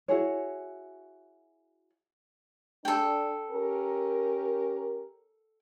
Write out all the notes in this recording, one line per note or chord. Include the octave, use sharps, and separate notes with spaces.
E4 F#4 G#4 C#5
D4 A4 G5
C#4 G4 A#4